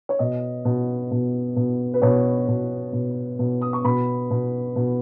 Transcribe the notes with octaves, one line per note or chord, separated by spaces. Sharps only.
C#5
B2 D#5
B2
B2
B2
B4
B2 C#5
B2
B2
B2
D#6
C#6
B2 B5
B2
B2